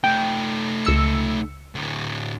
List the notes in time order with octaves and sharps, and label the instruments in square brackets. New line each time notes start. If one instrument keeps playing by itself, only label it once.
[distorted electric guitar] A3 D#4 [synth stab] G5
[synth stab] C#2 E6 C#7
[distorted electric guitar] D2 A2